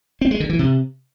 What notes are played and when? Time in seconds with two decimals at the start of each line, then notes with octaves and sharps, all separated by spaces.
0.21 C4
0.31 G#3
0.40 D3
0.50 E3
0.59 C3